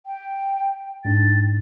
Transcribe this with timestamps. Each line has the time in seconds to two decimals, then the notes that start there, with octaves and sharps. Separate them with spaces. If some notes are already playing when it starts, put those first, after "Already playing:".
0.06 G5
1.05 G#2 D4 A6